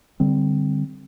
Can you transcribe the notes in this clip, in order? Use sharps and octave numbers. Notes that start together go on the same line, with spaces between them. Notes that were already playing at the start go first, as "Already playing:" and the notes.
D3 G3 C4